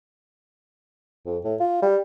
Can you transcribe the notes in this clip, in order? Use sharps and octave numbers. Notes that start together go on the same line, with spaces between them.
F2
A2
F4
G3